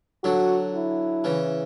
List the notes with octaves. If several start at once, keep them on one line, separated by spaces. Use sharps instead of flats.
D3 F#3 F#4
E4
C#3 E3